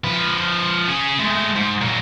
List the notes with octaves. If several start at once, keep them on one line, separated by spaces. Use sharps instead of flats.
F3 B4
C#4 G#4
G#3 A3
G#2
A#2 F#3